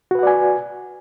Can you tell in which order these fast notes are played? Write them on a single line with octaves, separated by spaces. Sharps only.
F#4 B4 F#5 D5 G#5